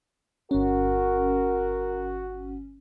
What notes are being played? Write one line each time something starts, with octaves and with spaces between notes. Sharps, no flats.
G1 C#4 F#4 A#4